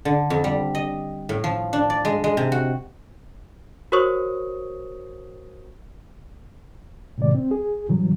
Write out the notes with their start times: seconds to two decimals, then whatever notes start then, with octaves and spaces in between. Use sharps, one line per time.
0.05 D3
0.30 F2
0.44 G3
0.75 D#5
1.29 A2
1.44 F3
1.73 D4
1.90 D5
2.05 G#3
2.24 G#3
2.37 C3
2.52 F#4
3.92 F#4 A#4 C5 C#5 C#6 D#6
7.18 A2 C3 D#3 G#3 D5
7.35 C4
7.51 G#4
7.89 A2 C#3 E3 F#3 G3